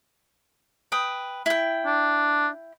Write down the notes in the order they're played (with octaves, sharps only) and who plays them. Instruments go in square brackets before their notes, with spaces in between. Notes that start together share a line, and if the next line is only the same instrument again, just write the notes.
[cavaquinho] B4 G5 D#6
E4 G5
[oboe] D4